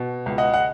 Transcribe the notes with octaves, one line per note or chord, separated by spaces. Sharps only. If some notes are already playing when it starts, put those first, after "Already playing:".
Already playing: B2
C#2
D#5 F#5
F#5